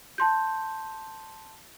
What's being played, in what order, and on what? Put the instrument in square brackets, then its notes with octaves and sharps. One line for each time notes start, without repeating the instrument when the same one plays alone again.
[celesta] A5 C6 G6